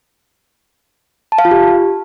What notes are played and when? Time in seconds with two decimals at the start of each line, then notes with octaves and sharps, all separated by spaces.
1.32 A5
1.38 F5
1.45 F4
1.51 G4